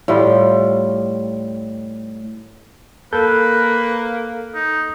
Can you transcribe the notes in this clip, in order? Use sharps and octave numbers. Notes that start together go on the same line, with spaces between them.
A2 G3 F4
A#3 A4 B4 G6
D#4